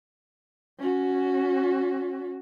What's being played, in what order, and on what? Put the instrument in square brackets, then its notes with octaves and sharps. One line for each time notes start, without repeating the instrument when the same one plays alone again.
[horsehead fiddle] C#4 F#4